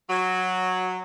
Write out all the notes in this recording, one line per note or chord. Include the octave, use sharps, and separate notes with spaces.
F#3